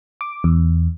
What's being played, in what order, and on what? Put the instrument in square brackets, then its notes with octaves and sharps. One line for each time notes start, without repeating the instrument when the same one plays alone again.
[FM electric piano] D6
E2